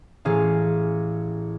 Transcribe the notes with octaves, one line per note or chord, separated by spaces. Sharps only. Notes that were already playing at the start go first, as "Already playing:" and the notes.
A1 G#4 F5